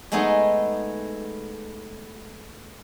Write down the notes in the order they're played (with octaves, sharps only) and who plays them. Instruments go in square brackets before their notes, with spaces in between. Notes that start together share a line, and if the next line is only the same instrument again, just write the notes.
[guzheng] G#3 A3 B3 D#4 G#4